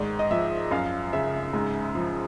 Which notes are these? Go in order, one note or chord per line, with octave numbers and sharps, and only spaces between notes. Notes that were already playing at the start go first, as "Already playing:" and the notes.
Already playing: G#2 D#3 D5
D#5
F3 E5
F#2 F5
C#3 E5
G#2
F3